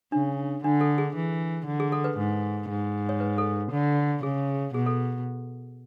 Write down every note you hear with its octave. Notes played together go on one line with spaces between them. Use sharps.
C#3 D4
D3 D4
A4
G#4
E3
D3
G#4
A4
B4
G#2
G#2
C#5
B4
A4
D3
C#3 G#4
B2 G#4
A4